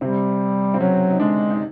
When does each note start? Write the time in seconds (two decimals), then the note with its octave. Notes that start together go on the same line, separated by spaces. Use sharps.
0.01 C3 G3 C4
0.74 C4
0.80 C#3 F#3 C#4
1.11 D#4
1.20 D3 G#3 D4
1.50 D#4